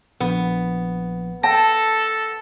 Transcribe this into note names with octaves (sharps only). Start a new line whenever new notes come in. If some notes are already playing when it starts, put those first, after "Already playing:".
A#1 B3
A4 G5 A5 A#6